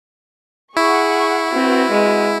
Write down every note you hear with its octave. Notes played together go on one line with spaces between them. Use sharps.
E4 G#4 F#5 C#6
C4 F#4 B4
G#3